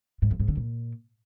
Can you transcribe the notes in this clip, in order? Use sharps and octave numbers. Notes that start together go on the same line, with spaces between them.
G#2
F2
G#2
D3
A#2